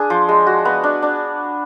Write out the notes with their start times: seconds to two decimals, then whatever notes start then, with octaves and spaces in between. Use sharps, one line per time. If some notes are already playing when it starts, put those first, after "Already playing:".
Already playing: D4 G#4
0.10 F3
0.29 G#3
0.47 F#4
0.65 B3
0.84 D4
1.02 D4